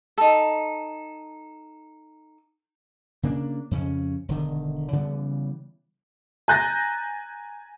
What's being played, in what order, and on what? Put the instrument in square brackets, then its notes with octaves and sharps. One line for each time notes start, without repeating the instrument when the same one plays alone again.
[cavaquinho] D#4 A4
[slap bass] C#3 A#3 B3 D4
F2 C#3 C4 C#4
E1 D3 D#3
C#3 E3 G3 B3
[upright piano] G#5 A#5 F#6 G6 A6 A#6